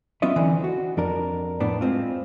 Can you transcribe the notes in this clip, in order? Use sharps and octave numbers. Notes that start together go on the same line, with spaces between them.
F#3 B3 C#4 F4 D#5 E5
D2 D3 E3 C4
F#4
F2 D4 A#4
A2 B3 D4
G#3 C4 F4